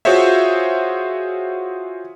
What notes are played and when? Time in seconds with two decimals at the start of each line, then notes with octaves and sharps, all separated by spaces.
0.05 F4 F#4 G#4 C5 C#5 E5